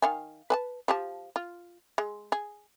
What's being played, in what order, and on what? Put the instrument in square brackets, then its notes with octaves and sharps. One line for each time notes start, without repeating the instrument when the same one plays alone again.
[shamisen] D#3 F5 G#5
B4 G#5 A5
F3 G4 A5
F4
G#3
G#4